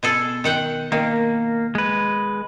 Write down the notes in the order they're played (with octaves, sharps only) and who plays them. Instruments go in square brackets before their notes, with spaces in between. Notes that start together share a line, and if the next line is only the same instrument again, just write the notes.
[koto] B2 G#4 A4
D#3 F#5 G5
[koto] D#3 [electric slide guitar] A#3
[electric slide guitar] G#3 B4